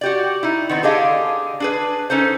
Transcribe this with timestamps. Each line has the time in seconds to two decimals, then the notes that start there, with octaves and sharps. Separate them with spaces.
0.01 F#4 G4 D5
0.43 D#4 E4
0.69 D#3 B3 C4
0.83 D3 D4 G4 G#4 D#5 F5
1.60 D4 G#4 B4
2.10 C#4 D#4 A4 C5